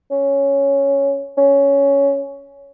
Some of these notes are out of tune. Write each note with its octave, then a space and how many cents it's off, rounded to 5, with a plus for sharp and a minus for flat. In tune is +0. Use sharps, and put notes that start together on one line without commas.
C#4 +0
C#4 +10